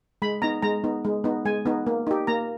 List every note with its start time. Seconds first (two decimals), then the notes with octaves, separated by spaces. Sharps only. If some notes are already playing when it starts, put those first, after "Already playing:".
0.22 G#3 B5
0.42 B3 D#4 A#5
0.62 G#3 A#5
0.84 B3 D#4
1.05 G#3
1.24 B3 D#4
1.45 G#3 G#5
1.66 B3 D#4
1.87 A#3
2.07 D#4 G4
2.27 A#3 A#5